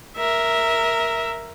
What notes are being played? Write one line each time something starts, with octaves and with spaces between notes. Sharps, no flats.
A#4 E5